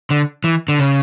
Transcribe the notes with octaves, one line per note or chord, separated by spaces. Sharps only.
D3
E3
D3
C#3